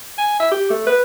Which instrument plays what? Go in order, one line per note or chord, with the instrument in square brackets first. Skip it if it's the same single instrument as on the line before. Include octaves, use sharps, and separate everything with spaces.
[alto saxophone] G#5
E5
G4
A3
B4